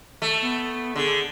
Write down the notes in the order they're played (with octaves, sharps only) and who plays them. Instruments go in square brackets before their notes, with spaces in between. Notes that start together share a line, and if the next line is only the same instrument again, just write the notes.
[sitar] A3
[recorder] B3
[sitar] D3 [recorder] G#4